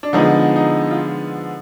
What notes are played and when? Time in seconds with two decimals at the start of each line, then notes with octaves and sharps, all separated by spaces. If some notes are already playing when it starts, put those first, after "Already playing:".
0.03 D4
0.13 D3 F3 G#3 B3 D#4
0.56 D#4
0.90 F4